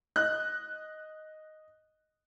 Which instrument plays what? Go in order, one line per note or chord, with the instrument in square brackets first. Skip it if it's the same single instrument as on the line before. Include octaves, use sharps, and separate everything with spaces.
[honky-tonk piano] D#5 F#6